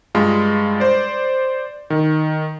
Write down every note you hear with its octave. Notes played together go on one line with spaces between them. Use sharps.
G2 G#3 F4
C5 D5
D#3